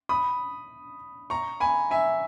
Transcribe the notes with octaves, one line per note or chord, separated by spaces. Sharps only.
B5 D#6
A#5 C#6
G#5 B5
E5 G#5